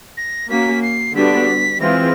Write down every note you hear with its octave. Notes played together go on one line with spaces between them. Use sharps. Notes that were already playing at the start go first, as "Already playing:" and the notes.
A#6
A#3 C#4 F#4 B6
C7
D3 G3 B3 D4 F#4 B6
E3 G#3 C4 F4 G#4 A#6